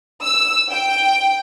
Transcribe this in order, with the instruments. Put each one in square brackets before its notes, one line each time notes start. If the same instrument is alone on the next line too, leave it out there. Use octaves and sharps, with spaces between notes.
[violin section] E6
G5